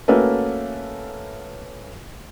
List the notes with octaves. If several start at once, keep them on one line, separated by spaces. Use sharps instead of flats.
A3 A#3 C#4 F#4 A4 B4